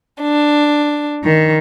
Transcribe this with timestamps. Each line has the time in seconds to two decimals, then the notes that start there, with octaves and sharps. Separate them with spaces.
0.22 D4
1.25 D#3